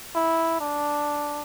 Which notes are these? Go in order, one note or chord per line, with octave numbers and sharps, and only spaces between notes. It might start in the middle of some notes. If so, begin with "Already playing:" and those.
E4
D4